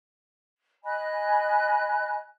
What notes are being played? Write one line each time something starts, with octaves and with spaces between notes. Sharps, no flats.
D#5 G#5 B5 F#6